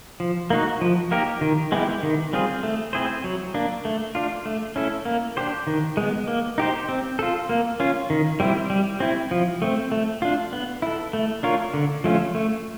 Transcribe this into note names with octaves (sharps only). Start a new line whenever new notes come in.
F3
A#3 D#4 F#4
F3
A#3 D#4 G4 A#4
D#3
G#3 B3 E4 G4
D#3
G3 C4 F4 G#4
A3
C4 E4 G#4 C5
F#3
A#3 D4
A3
D4 F4
A3
C#4 E4 A4
A#3
D4 G4 C5
D#3
G#3 B3
A#3
D#4 G4 C5
C4
F4 A4
A#3
C#4 F4
D#3
G3 C4 E4
G3
C4 E4
F3
A3 C4
A3
D4 F4
B3
E4 A4
A3
D4 F4 A#4 C#5
D3
F3 A3 C#4 F4
A3